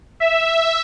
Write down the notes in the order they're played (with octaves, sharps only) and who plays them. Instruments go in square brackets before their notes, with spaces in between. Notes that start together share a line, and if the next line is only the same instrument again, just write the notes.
[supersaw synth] E5